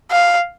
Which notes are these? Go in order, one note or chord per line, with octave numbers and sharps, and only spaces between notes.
F5